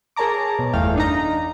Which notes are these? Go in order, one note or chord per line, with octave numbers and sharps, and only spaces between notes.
G#4 A#4 C#5 A5 A#5 D6
B2
G1 E2 E3 A3 F5 G5
D4 D#4 A#5